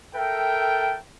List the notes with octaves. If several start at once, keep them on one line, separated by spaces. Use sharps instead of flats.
A4 A#4 E5 G5